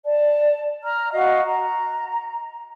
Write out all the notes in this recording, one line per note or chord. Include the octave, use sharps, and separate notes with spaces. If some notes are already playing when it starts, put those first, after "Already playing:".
D5 A5
A#5 F6
F#4 D#5 F5
A#5